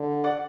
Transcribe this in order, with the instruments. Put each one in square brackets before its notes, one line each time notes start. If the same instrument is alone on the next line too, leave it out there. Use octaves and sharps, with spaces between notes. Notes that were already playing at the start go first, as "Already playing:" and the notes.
Already playing: [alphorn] D3
[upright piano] D5 F#5